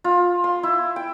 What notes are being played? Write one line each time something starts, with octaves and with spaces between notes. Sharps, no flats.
F4
C6
E4
G5